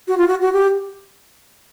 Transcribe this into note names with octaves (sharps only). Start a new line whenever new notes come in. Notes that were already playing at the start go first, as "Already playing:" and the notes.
F#4
F4
F#4
F#4
G4